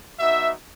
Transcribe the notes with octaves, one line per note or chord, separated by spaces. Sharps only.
B3 D#4 F#4 E5